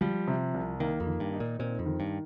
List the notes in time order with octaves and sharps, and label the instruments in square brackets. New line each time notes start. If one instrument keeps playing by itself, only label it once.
[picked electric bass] F3 [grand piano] G3
[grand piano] C3
C2
[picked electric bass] D#3 [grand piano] A#3
[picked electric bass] F2
[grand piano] D#3
[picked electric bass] G2
[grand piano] D#4
[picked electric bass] A#2
[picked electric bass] A#2 [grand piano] C4
[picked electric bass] F2
[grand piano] D#3
[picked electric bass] G2